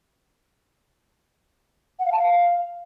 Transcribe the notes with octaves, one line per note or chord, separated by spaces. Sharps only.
F#5
F5
A5
F5